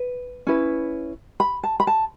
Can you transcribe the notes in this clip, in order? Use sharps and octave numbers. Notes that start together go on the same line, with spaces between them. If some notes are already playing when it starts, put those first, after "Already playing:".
Already playing: B4
C#4 E4 B4
B5
A5
B5
A5